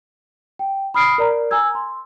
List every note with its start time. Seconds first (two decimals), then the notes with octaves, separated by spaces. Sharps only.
0.59 G5
0.94 B5 D#6 F6 C7 D7
1.18 A#4 D5 A#5
1.51 G#5 A#5 E6 G#6
1.75 C6